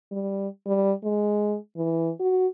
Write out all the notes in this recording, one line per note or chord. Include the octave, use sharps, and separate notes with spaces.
G3
G3
G#3
E3
F#4